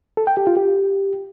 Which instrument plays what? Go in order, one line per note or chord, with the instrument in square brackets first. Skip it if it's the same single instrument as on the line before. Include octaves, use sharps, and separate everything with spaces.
[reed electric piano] A4
G5
G4
F4
G4